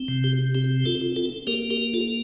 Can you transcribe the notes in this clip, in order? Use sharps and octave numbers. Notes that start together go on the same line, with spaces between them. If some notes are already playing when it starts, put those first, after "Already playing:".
Already playing: C4
C3
G4
C4 G4
F4 A4
F4
F4 A4
A#3 G4 A#4
G4 A#4
F4 A4